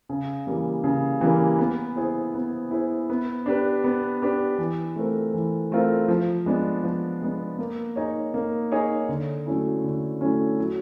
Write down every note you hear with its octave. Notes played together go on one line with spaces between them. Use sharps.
C#3
E3 G3 A#3
C#3
E3 G3 A#3
B3
E4 G#4 C5
B3
E4 G#4 C5
B3
D4 G4 B4
B3
D4 G4 B4
E3
A3 C4 F4 A#4
E3
A3 C4 F4 A#4
F3
G#3 B3 D4
F3
G#3 B3 D4
A#3
D#4 G#4 C#5
A#3
D#4 G#4 C#5
D3
F#3 A3 C#4 E4
D3
F#3 A3 C#4 E4
F#3